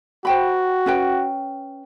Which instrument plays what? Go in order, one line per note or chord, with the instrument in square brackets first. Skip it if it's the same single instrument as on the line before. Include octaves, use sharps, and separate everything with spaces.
[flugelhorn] F#4 [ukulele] C5 G5 B5
[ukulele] C#4 B4 G5